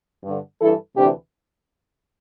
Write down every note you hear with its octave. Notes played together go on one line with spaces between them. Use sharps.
G2 D3
G2 E3 E4 A4
D2 C3 E3 D4 G4